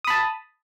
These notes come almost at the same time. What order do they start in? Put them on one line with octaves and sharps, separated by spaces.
D#6 B5 A5